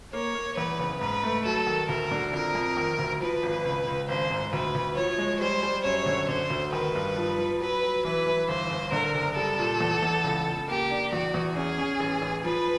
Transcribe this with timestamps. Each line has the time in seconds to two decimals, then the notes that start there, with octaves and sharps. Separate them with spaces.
0.13 A#3 C#5
0.35 A#3
0.57 E2 B4
0.80 F#1
1.01 G#2 B4
1.23 A3
1.45 F#3 A4
1.67 D#3
1.89 D2 A#4
2.11 D3
2.33 F2 A#4
2.55 F2
2.77 D#3
2.99 D2
3.20 F3 B4
3.43 G#1
3.65 C#2
3.87 C#2
4.08 G#1 C5
4.31 G#2
4.53 D2 B4
4.75 D2
4.96 F3 C#5
5.18 G#3
5.40 G3 C5
5.63 G3
5.84 F#2 C#5
6.06 D3
6.29 D3 C5
6.50 D2
6.73 D#3 B4
6.95 G2
7.16 F3
7.38 F3
7.61 F#3 B4
7.83 F#3
8.05 E3 B4
8.27 E3
8.49 G1 C5
8.71 G1
8.92 D3 A#4
9.15 F#1
9.36 G3 A4
9.58 A#2
9.80 E2
10.02 E2
10.24 C#2
10.46 C#2
10.68 A#3 G4
10.90 D4
11.12 E2 F#4
11.34 E2
11.56 C#4 G#4
11.78 C#4
12.00 A1
12.22 A1
12.44 F3 B4